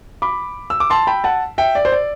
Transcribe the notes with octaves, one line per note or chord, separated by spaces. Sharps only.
B5 D6
E6
D6
A5 C6
G5 B5
F#5 A5
E5 G5
D5
C5
D5